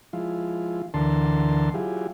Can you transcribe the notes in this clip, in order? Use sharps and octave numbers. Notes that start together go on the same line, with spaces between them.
F3 G#3 E4 F4
D2 D3 E3 A#4 A5 C6
F#3 E4 F4 G4 G#4